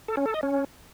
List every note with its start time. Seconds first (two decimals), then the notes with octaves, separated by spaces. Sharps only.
0.08 A4
0.17 C#4
0.26 A4
0.34 D#5
0.43 C#4